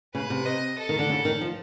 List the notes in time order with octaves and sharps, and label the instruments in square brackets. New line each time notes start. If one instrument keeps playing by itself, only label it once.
[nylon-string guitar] C#3 [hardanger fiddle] B4
[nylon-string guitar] C3
[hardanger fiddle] D#5
A4
[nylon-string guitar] D#3
D3
C#3
D#3
F3